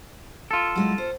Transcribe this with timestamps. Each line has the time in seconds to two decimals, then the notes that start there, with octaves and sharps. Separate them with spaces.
0.51 F4 A4
0.76 F#3 G#3 E4
0.98 C5